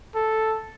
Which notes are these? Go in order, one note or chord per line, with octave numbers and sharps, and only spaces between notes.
A4